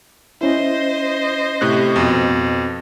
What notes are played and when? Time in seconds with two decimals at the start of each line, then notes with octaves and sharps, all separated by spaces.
0.41 C#4 E4 C5 D#5
1.61 A2 C3 F#6
1.96 F2 B2